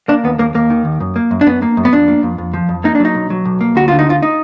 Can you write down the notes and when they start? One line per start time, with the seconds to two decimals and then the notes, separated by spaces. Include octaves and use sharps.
0.08 A#3 D4
0.24 D#2 B3
0.39 D#2 A#3
0.54 D#2 A#3
0.70 D#3
0.85 D#2
1.00 F#2
1.16 A#3
1.31 F#2
1.41 D4
1.46 F#2 B3
1.62 A#3
1.77 F#2
1.85 B3
1.92 F2 D4
2.08 A#3
2.23 F2
2.38 F2
2.54 F3
2.69 F2
2.84 A#3 D#4
2.95 D4
3.00 F#3 D#4
3.15 B1
3.30 F#3
3.45 B1
3.61 A#3
3.76 D2 F#4
3.88 D3 F4
3.99 D#4
4.07 D2 F4
4.22 D#4